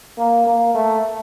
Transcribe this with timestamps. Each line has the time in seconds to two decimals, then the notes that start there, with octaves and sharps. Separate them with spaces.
0.18 A#3
0.47 A#3
0.75 A3